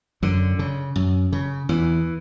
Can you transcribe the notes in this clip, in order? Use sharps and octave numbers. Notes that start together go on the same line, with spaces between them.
F#2 D3
C#3
F#2
C#3
E2 E3